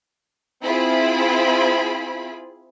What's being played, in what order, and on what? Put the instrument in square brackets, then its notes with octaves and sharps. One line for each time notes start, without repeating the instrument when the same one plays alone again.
[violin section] C4 E4 F4 G#4 B5